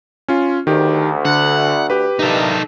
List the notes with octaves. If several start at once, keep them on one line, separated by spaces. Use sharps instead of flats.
C#4 F4
D2 D#3 G4
D3 F#5
G4 B4
G2 D#3 E3 D#4 A4